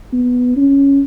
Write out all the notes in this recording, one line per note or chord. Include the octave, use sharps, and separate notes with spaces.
B3
C#4